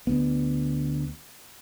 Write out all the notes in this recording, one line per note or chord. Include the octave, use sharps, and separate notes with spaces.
D2 B3